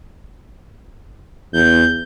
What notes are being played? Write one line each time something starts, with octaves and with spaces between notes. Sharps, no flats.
E2 G6